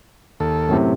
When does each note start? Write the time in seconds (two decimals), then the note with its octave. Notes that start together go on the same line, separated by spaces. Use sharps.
0.40 D#2 A4
0.69 F#2 A2 C3